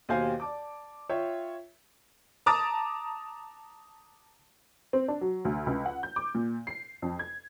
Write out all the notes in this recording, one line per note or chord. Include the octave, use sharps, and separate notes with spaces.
D#2 B2 G4 C5 F5 G#5
D5 A5 D6
F4 C#5 E5 G5
A5 A#5 D6 D#6 A6
C4
D4
F#3
D2
C#2
F#5
G6
D6
A#2
C7
F2
G#6